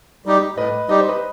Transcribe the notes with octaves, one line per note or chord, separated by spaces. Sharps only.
G3 D#4 G4
A2 B4 D#5
G3 D#4 G4 D#5
C5
B4 D#5